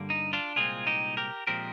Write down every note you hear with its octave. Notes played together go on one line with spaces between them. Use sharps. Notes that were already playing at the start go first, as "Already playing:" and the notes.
Already playing: G2 D3 G3 A#3
D#4
D4 F4
C2 A#2 G#3 C4 F4 G#4
D#4 G4
G4 A#4
A#2 F3 G#3 C4 G4 A#4